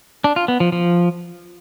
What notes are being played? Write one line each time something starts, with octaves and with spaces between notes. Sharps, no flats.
D4
F4
B3
F3
F3